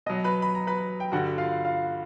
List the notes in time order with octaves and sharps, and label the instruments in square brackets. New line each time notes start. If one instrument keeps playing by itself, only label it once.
[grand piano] B2 F#3 D#5 D#6
B4 B5
B5
A#5
B4 B5
G5
G2 D3 G3 F#4 F#5
F4 F5
F4 F5